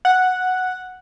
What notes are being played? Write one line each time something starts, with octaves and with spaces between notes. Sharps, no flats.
F#5